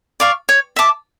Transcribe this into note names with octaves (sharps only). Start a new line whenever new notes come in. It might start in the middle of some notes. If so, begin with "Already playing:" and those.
D5 F5 C#6
C#5
E5 A5 D6